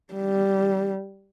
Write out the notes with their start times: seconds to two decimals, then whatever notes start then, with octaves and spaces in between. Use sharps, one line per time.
0.14 G3